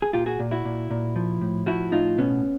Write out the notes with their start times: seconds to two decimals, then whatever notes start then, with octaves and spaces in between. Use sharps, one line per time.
0.02 G#4
0.13 A#2 F4 G4
0.26 F#4 G#4
0.39 A#2
0.51 E4 F#4
0.65 A#2
0.90 A#2
1.16 F3
1.41 A2
1.66 F3 E4 F#4
1.92 A2 D#4 F4
2.18 B2 B3 C#4